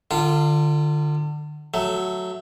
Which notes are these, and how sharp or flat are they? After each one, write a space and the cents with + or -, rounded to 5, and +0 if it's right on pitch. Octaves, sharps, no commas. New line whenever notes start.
D3 +30 F4 -15
F#3 +5 A3 +5